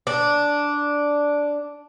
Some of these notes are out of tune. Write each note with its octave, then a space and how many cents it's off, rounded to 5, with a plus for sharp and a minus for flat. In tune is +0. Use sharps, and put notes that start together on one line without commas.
D4 -5